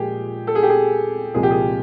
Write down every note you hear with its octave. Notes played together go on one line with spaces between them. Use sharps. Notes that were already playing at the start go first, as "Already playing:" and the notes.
Already playing: A#2 F3 G#3 G4 G#4
A4
G#4
G4
G#4
C2 A#2 F3 G#3 G#4
G4
G#4